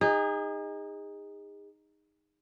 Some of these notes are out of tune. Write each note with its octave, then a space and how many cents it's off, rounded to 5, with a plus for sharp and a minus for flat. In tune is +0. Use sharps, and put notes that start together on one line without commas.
D#4 +0 G#4 -35